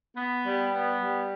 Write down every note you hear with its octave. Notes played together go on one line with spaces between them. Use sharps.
B3
G3
B3
G3